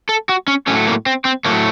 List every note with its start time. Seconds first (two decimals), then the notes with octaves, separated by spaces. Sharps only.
0.09 A4
0.29 F#4
0.48 C#4
0.67 A2 F#3 A3 C#4
0.87 A#3
1.06 C4
1.25 C4
1.45 A2 F#3 A3 A#3